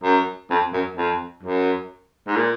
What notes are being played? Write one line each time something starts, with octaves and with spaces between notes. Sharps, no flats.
F#2
F2
F#2
F2
F#2
G#2
A#2